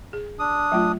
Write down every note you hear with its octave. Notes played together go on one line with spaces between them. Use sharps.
G#4
D4 D#6
F#3 A3 F4